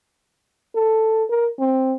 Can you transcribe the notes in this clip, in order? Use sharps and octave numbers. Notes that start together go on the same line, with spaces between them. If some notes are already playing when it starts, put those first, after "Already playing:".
A4
A#4
C4